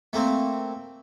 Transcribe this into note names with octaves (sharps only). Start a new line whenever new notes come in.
A3 A#3 C4